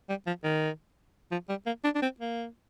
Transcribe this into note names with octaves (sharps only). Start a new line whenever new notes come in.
G3
F3
D#3
F3
G3
A#3
D4
D4
C4
A#3